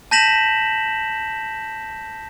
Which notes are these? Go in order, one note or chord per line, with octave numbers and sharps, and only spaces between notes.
A5 G6 A#6 B6 E7 F#7